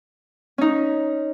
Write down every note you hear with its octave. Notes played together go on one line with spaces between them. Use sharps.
C#4 D#4